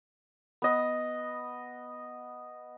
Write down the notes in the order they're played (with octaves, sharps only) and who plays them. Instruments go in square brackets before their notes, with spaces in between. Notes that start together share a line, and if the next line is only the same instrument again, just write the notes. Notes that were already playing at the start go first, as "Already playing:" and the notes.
[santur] B3 D#5